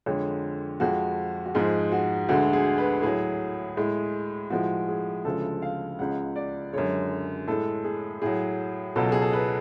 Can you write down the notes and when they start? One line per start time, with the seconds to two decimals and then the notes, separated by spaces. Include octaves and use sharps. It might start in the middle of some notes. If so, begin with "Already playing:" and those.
0.06 F2 D3 G#3 C#5
0.80 F2 F3 G#3 F#4
1.46 F#4
1.55 G#2 F3 G#3 G#4
1.92 F#4
2.29 D2 D3 G#3 F#4
2.53 G#4
2.78 B4
3.02 A2 F#3 G#4
3.77 A2 G#3
4.50 A2 F3 G#3 F#4
4.89 G#4
5.25 D2 C#3 F3 G#3 A4
5.62 F5
5.99 C#2 C#3 G#3 F#5
6.36 D5
6.73 F#2 D3 G#3 C#5
7.47 A2 G#3 A4
7.84 G#4
8.22 A2 F#3 G#4
8.96 C#2 B2 F#3 A4
9.12 G#4
9.22 A4
9.33 B4